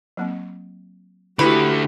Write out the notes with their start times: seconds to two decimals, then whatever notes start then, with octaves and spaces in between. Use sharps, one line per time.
0.17 F#3 A#3 C4
1.39 D3 A3 E4 F#4 G4 B4